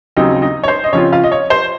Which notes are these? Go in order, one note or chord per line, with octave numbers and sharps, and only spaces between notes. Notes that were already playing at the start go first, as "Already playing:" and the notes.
D#2 C#3 F#3 C4 D#4 D#5
D#4 D#5
C#5
C5
D#5
C#3 F3 C4 F4 C#5
F4 F5
D#5
C#5
C5